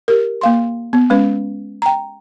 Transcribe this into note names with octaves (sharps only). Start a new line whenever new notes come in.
G4 A#4
A#3 F5 C6
B3
G#3 C#4 B4
G5 A#5